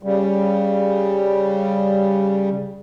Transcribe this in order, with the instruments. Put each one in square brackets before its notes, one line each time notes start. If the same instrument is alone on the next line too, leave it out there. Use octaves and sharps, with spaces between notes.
[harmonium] C#3 G3